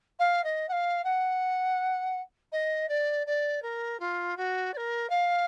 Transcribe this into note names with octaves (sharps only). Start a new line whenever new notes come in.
F5
D#5
F#5
F5
F#5
D#5
D5
D5
A#4
F4
F#4
D5
A#4
F5